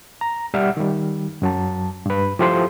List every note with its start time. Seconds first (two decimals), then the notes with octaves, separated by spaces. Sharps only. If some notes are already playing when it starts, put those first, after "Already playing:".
0.21 A#5
0.54 G3 D5 E5 F#5 F6
0.77 D#3 G3
1.42 F#2 F#3 A5
2.06 G2 B4
2.39 F3 E4 G4 A4 C5 C6